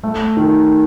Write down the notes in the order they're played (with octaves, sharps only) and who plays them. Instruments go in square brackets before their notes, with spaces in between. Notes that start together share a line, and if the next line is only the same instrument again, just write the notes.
[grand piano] A3
D#3